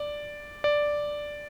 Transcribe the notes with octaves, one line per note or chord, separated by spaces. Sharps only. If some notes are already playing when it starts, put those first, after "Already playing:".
Already playing: D5
D5